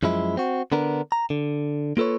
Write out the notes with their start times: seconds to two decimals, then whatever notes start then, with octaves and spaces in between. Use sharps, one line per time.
0.03 F#2 F3 G#3 E4
0.37 C4 F#4
0.72 D3 B3 D4 A#4
1.12 A#5
1.30 D3
1.97 A#3 F4 A4 B4 C#5